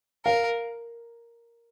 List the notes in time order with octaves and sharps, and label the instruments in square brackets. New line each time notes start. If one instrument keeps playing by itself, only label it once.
[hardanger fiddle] A#4 [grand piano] F5